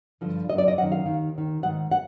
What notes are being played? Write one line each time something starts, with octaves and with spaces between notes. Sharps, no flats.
G2 D3 F3
D#3 D#5
F#2
D5
D#5
F#2 D#3 F#5
F5
D#2 D#3
D#2 D#3
G#2 D#3 F#5
F#5